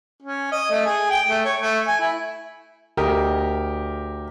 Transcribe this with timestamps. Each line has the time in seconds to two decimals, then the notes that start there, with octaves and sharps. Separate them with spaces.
0.22 C#4
0.52 D#5
0.71 A3
0.85 G#4
1.10 G5
1.28 A3
1.45 C#5
1.61 A3
1.87 G#5
1.99 E4
2.97 D2 G4 A#4 D#5